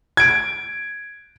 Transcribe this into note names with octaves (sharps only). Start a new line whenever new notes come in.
G#6 D7